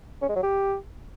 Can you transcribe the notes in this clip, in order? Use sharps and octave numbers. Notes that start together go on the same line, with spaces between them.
C#4
G#3
F#3
G4